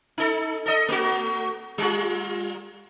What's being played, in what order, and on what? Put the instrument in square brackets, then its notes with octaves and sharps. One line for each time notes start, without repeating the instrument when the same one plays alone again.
[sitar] D#4 A4
A4 D#5
A3 F#4
G3 F4